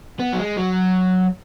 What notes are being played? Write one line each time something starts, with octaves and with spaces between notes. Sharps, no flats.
B3
F#3
G#3
F#3